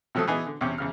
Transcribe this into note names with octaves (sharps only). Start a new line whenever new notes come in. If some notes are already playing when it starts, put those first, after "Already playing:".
C3 F3 F#3 A3 A4 D#6
E3 B3 D#4 G#4
D3
E2 C3 C#4 G4 D6
E2 C#3 F6